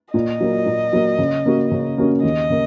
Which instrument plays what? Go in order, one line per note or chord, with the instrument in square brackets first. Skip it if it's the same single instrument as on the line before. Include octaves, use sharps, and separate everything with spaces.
[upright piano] A#2 [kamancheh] D#5
[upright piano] F#3 A#3
A#2
F#3 A#3
C#3
A#3 C#4 F#4
C#3
A#3 C#4 F#4
[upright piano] D#2 [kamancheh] D#5
[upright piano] C#3 A#3